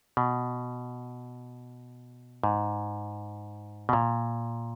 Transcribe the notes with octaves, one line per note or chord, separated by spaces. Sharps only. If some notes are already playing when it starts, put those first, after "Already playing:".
B2
G#2
B2
A#2